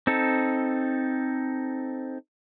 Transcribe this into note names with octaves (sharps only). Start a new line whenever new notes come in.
C4 D#4 A4